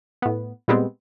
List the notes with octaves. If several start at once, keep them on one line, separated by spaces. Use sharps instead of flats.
A2 B3
A#2 G3 G#3 B3 C4